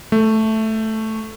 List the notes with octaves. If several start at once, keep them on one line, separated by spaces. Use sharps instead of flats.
A3